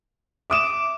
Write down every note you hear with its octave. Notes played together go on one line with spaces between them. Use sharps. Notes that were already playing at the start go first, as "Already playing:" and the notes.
E5 D6 D#6 E7